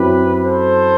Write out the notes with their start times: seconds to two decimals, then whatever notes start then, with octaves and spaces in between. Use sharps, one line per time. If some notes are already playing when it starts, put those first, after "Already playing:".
Already playing: F#2 F#3 C4 E4 G4 B4
0.43 A4 C5